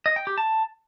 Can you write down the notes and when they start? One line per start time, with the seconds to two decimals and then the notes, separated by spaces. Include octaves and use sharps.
0.06 D#5
0.16 G5
0.27 G4
0.38 A5